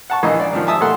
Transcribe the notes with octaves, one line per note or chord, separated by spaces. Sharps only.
F#5 A5 C#6
A#1 E3 D#5
D5
D#3 F3
E5 G#5 A5 D#6 E6
A#2 A3 F#5 C6